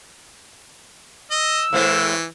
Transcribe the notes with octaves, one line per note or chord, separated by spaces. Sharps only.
D#5 E6
A2 E3 G#3 C5